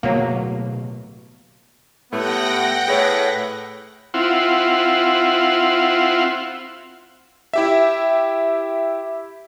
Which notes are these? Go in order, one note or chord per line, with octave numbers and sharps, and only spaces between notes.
D1 B2 F#3 A3 A#3
A2 G3 A3 B3 F#5 G5 A#6
A2 G#4 B4 C#5
C4 E4 F4 F#5
E4 G4 E5